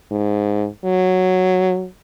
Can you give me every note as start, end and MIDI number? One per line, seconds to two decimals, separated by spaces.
0.11 0.67 44
0.84 1.86 54